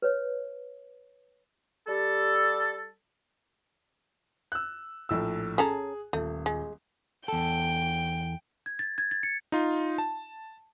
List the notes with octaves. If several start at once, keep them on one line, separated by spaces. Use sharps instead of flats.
B4 C#5
G3 G4 A4
E6 F#6
A#1 A2 E6
C#4 G#4 A4 A#5
D#1 A3
G#3
E2 A4 G5
G#6
A6
G#6
A6
C#7
D#4 F4
A5